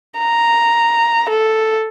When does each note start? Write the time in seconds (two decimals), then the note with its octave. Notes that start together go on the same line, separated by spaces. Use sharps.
0.18 A#5
1.29 A4